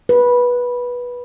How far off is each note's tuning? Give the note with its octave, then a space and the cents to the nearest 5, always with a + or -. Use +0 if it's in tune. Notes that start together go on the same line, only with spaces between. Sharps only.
B4 -15